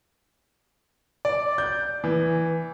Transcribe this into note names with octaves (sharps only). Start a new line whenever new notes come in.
D5
G6
E3